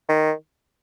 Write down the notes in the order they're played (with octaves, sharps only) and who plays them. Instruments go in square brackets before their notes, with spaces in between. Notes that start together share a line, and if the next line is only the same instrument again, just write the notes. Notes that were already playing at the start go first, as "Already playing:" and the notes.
[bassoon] D#3